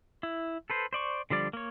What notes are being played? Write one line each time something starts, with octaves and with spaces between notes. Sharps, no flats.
E4
A4 B4 C5
C5 D5 C#6
D3 F3 G3 D5
A#3 C#5